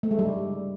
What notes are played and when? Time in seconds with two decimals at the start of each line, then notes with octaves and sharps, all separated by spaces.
0.03 A3
0.11 G#3
0.19 G3